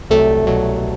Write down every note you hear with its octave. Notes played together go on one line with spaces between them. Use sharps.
C2 C3 F#3 A3 A4
C2 B2 F#3